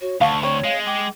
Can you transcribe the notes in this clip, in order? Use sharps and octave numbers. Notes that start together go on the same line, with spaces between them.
F#4 C#5
D2 D5 F5 F#5 A5 C#6
C4 C#5 C#6
G#3 F5
G5 D6